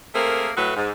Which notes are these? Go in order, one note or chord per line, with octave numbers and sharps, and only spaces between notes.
A3 A#3 C4 G#4 A#4
A2 F#3 A3 B4
G#2